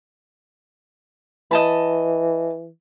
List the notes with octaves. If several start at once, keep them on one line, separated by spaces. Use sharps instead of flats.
E3 D#5 A5 B5